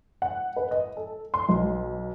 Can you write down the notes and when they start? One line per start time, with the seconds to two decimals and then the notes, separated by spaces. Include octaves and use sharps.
0.22 F#5
0.56 B4
0.71 D#5
0.97 A4
1.34 C6
1.49 B1